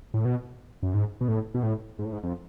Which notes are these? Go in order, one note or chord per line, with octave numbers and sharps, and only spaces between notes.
A2
B2
F#2
G#2
B2
A2
B2
A2
G#2
A2
G#2
F2